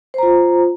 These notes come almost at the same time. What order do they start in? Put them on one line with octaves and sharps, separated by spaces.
C5 A#5 F4